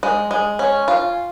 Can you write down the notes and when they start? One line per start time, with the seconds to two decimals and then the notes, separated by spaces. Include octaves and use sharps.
0.03 G#3
0.31 G#3
0.59 C#4
0.88 F4